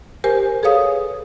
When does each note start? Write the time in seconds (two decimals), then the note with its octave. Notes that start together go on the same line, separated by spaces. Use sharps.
0.24 G4 A#4 C5 G#5
0.63 G#4 A4 B4 C#5 F5 D#6